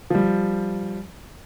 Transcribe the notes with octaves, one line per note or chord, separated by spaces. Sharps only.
F3 G3